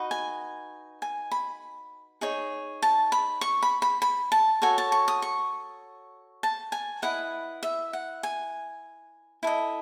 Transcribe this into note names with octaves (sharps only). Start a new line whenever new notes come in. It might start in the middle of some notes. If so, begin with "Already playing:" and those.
Already playing: D#4 F#4 B4 D#5
G#5
G#5
B5
D#4 G#4 C#5
A5
B5
C#6
B5
B5
B5
A5
F#4 A4 C#5 G#5
A5
C#6
D#6
C#6
A5
G#5
E4 B4 D#5 F#5
E5
F#5
G#5
E4 A4 D#5